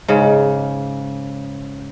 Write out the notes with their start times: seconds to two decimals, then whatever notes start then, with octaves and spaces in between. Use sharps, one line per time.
0.08 G#2 C#3